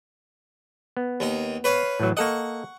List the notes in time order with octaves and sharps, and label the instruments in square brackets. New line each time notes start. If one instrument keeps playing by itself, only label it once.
[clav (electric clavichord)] B3
[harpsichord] D#2 D#4
B4 C#5 F5
[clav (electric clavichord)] A2 E3 F#3
[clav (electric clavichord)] A#3 A4 D#5 [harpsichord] F#5 C#6